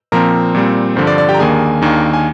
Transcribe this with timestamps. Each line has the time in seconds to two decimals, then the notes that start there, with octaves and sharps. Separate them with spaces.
0.12 A#2 F3 C4 A#4 A#5
0.55 A#2 G3 C4
0.96 G2 D3 F3 C5
1.07 D5
1.18 D5
1.29 G4 G5
1.34 A#5
1.39 D#2 D#3 A#3 D4 G#4 G#5
1.82 D#2 D#3 A#3 D4
2.13 G#5